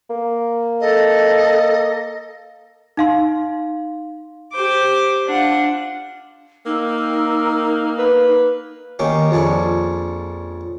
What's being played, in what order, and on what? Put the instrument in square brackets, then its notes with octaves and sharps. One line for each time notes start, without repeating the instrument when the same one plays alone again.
[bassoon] A#3
[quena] A4 [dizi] D#5
[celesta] D#4 F5 C6
[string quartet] G4 C5 D6
D4 F4 F#5
[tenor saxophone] A#3 [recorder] D#4 [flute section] A#4 G5 E6
[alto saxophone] B4
[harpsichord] D#3 A#3 C#4 G4
A#1 F2 C#4 D4